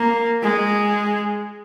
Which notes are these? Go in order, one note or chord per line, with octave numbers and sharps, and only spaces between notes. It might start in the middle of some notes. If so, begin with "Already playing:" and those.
Already playing: A#3
G#3